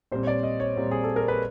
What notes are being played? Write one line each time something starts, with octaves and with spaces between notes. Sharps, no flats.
A#2 G3 C4 C5
C#5
D5
D#5
C#5
A#2 G3 C4
G#4
A4
A#4
B4